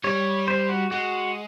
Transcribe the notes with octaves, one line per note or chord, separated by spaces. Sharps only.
G3 C#5
C5
F#4
G#3 F#4